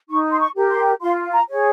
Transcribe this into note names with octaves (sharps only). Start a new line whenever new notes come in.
D#4 C#6
C6
C#6
G4 A#4
C6
F4 C6
A#5
G#4 C#5